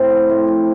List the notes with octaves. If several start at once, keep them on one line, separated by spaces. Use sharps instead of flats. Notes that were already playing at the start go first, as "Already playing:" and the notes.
Already playing: A2 C4 C5
F3
A2
F3